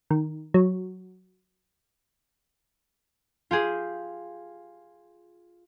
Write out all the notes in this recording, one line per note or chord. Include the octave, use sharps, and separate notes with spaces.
D#3
F#3
F4 G4 G#4